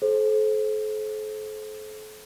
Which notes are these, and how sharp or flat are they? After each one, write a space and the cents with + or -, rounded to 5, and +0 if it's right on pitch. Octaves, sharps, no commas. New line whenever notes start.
A4 -40 C5 +20